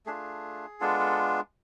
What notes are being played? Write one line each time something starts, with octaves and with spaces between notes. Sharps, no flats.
A3 D4 F4 G#4
G#3 B3 D4 F4 A4
A4